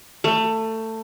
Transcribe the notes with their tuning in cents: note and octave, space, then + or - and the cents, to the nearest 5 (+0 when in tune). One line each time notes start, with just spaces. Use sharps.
A3 +20